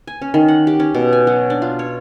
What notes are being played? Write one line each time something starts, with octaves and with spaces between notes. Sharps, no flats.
G#5
C#4
D#3
F#5
G4
C#4
B2
G#5
F#3
D4
F4
C#5